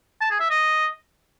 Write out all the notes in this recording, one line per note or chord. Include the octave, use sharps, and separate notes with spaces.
A5
G#4
E5
D#5